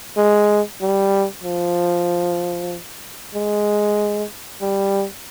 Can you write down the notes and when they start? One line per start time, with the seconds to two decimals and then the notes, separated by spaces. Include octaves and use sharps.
0.17 G#3
0.81 G3
1.44 F3
3.35 G#3
4.61 G3